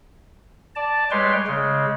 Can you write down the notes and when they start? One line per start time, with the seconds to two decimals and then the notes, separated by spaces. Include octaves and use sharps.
0.76 D5 A5
1.11 G3 G#3 B4 C#5 G5 C6
1.47 C#3 G#3